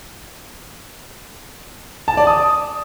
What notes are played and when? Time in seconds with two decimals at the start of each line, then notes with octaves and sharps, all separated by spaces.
2.08 A5
2.17 D5
2.27 D#6